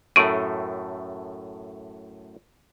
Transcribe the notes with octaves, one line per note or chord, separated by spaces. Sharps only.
F#2 A2 A3 C#6 D7 D#7